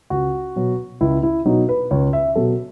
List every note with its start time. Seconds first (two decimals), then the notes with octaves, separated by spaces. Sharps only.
0.10 C#2 F#4
0.56 B2 F#3
1.01 C#2 E4
1.23 E4
1.46 B2 F#3 D#4
1.69 B4
1.91 C#2 C#5
2.13 E5
2.36 B2 F#3 A4